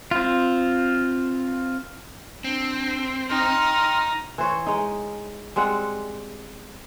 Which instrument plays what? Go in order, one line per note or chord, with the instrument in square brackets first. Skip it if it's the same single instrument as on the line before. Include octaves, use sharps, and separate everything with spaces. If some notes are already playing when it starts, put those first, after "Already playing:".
[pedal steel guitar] C4 F4
[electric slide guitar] C4 [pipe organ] D4
[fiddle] D#4 [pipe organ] G5 C6 F6
[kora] E3 C5 C#5
G#3 D#4
G3 G#3 C4 F#5